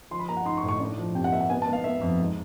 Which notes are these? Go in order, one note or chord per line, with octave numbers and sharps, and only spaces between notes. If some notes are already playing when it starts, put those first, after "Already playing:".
F3 C6
B5
A#3 A#5
F#5
D#4 C6
C#6
A2
C#6
D4
F3
C3 G5
F#5
A#3 E5
F#5
B3 G#5
A5
B3
F5
B3 E5
F2
G#2